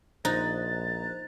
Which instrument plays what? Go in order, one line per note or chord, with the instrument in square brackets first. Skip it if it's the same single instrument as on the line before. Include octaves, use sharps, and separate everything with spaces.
[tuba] A#1 [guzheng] D#4 [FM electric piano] C5 A#5 F#6 [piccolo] A6